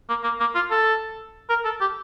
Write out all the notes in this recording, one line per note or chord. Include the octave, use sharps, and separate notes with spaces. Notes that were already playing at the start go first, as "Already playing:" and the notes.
A#3
A#3
A#3
F4
A4
A#4
A4
G4